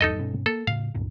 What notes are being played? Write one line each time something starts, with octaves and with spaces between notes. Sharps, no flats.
D#1 E2 G2 D#4 A4 D#5
G2 B2 C#4
A#3 A4
A2 C#3 F5
C#2 G2 A#2